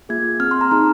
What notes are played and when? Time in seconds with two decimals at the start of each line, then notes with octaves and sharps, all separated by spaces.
0.09 A#3 F4 G#4 G#6
0.40 C4 F6
0.44 G#4
0.51 C6
0.61 A#5
0.71 A#3 D#4 G#4 A#5